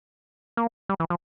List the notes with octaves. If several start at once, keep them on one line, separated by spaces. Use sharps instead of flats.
A#3
G3
E3
F3